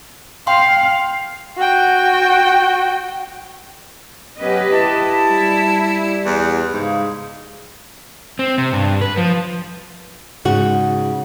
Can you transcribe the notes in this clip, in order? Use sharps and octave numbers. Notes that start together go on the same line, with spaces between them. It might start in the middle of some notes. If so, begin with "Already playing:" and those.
F5 G5 C6
F#4 G5
F#3 B3 C#4 G4 B4 D#5
E4 A5
G3
E2
G#2 C#3
C4
C3
G2
B4
F3
G#2 C#3 F#4